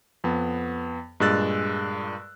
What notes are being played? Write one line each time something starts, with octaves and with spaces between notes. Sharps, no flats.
F2 B3
G2 A#2 G#3 E6 F#6 A6